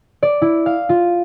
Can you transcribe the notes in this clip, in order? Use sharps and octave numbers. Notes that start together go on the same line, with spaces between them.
D5
E4
F5
F4